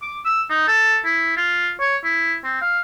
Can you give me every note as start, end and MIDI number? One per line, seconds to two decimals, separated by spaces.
0.02 0.17 86
0.25 0.42 88
0.50 0.67 63
0.68 0.99 69
1.05 1.33 64
1.37 1.71 65
1.80 1.97 73
2.04 2.35 64
2.44 2.60 60
2.61 2.80 77